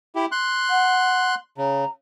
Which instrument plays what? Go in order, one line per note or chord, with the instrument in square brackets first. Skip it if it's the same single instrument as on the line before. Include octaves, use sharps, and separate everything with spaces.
[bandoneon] E4 G4
C6 F#6
[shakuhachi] F#5
[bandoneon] C#3 [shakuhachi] A#5